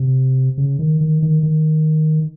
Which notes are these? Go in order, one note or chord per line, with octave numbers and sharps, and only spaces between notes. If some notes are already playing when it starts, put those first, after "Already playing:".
Already playing: C3
C#3
D#3
D#3
D#3
D#3